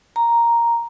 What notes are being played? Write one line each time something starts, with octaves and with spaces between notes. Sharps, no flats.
A#5